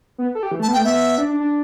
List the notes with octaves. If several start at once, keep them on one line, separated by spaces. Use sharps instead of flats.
B3
A4
G4
E3
A3 A5
B3
G5
A3
B3 E5
D4
D4
D4